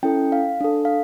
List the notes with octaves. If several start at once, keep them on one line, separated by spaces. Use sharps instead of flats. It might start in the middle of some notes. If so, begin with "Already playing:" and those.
C#4 E4 A4 G5
F5
D4 A4
F5